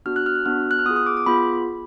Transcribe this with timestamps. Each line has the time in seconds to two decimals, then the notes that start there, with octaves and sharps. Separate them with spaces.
0.06 B3 D4 F#4 F6
0.16 F#6
0.26 F6
0.35 F#6
0.46 B3 D4 F#4 F6
0.71 F#6
0.79 F6
0.86 B3 D#6
0.89 F4 G#4
0.96 D#6
1.06 D6
1.17 D6
1.26 B3 F4 G#4 B5